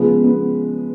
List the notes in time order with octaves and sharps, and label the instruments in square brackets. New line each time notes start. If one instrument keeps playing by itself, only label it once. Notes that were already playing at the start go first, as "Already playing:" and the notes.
Already playing: [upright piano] C#3 F3 G#3 B3
B3